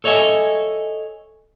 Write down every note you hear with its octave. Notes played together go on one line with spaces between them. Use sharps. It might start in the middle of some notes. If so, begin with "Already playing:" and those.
A4 C#5 D#5 E5 G#5